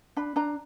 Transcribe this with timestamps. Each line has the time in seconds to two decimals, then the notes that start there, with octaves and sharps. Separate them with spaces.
0.17 D4 B5
0.36 D4 A#5